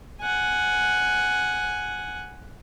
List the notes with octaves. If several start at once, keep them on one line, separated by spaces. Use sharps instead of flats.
F#5 G#5